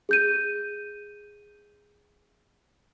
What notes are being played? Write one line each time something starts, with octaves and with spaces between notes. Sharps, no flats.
G#4 G6 D#7